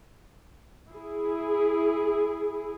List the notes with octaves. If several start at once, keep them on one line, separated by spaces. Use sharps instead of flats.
E4 G#4